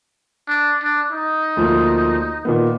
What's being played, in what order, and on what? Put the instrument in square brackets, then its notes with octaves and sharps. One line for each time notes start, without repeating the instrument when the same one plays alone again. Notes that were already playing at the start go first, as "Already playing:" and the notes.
[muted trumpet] D4
D4
D#4
[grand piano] D2 F3 A#3
A#2 D#3 B3